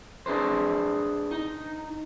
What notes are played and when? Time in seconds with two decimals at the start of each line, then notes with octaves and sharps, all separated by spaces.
0.26 D4 G#4 B4 C5
1.31 D#4